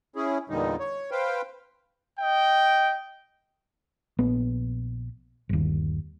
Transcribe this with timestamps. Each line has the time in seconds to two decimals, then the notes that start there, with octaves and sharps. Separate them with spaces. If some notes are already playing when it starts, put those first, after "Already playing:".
0.16 C#4 E4 G#4
0.50 E2 A#2 D3 G3 D#4
0.80 C#5
1.11 B4 C5 F5 G5
2.20 D#5 G5
4.19 A#1 B3
5.49 G1 D#2